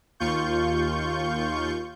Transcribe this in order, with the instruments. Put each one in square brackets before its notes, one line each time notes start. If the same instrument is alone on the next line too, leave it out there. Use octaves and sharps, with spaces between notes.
[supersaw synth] D#2 F4 C#6 G6